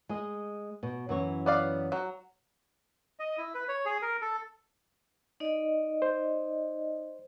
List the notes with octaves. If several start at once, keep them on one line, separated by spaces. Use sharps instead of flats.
G#3 G#4 D#5
B2
F#2 E3 C#5
B3 D5 F5
F#3
D#5
E4
B4
C#5
G#4
A#4
A4
D#4 D5 D#5
C5